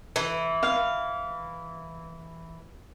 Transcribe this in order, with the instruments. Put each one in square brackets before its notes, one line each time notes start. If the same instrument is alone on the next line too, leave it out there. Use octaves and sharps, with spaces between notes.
[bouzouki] E3
[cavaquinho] F5